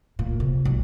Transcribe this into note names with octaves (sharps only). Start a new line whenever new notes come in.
A#2
C3
B1